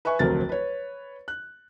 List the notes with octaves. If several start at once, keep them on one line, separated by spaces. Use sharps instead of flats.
B4 E5 G#5 C#6
F1 D2 F#3 C4 A#4 A6
B4 C#5
F#6